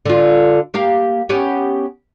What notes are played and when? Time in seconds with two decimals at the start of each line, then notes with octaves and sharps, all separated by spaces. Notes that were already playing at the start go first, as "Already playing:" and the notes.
0.06 D3 F4
0.74 A#3 G4 F5
1.29 B3 C#4 G4